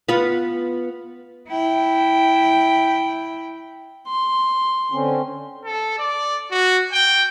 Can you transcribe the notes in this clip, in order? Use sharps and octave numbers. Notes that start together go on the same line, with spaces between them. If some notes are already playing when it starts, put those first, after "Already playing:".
B3 F4 B4
E4 G5
C6
D3 C4 C#4
A4
D5
F#4
G5